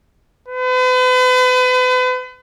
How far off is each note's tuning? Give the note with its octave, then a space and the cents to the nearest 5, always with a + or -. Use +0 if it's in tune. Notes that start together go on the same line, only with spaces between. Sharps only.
B4 +40